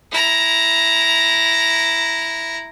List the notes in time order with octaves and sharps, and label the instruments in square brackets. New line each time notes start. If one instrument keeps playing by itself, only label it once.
[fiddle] E4 A#5